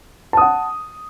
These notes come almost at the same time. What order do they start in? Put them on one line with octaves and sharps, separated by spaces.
A5 D#6 F#5